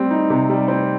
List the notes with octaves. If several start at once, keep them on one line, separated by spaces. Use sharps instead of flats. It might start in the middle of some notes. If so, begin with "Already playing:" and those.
Already playing: G3 C4
D#4
C3
G3
C4